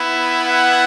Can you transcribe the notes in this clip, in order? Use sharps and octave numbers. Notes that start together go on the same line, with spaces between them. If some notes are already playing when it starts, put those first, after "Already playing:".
Already playing: B3 E4
F#5